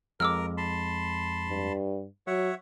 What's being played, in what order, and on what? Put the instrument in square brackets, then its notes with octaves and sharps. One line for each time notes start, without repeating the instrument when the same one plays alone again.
[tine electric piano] F2 G#3 [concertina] A#4 [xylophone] D6 E6 F6
[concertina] A5 B5 C6
[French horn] G2
[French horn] F#3 [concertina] C#5 E5 F#5